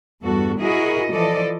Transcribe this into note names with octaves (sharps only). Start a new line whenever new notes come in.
E2 G2 F#4 A4
E4 F#4 G#4 A#4 D#5
E3 F3 A4 D5 D#5